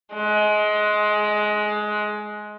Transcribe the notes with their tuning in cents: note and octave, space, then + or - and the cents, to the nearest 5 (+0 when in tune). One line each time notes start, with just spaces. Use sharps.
G#3 +20